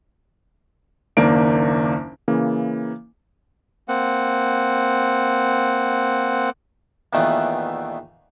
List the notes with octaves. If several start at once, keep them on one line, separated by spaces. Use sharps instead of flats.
F#1 D#2 A#3 D4 D7
C#3 E3 A#3
A#3 C4 F#5
E2 A#2 D#3 E3 A3 B3